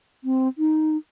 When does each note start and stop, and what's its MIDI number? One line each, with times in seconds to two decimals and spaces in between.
0.24 0.48 60
0.58 0.97 63